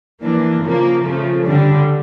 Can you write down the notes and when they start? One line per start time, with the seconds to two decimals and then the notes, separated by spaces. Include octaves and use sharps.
0.21 E3 A#3 D4
0.62 C#3 F3 A#3
1.03 C#3 F3 A3
1.43 D3 G3 D4